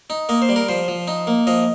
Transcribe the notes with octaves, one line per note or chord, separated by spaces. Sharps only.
D#4
A#3 D#5
C5
G3
A#4
F3 C5
F3
D#4
A#3
F3 D#5